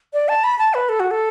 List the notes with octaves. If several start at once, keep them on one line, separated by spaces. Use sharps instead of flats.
D5
A5
B5
A5
B4
A4
F#4
A4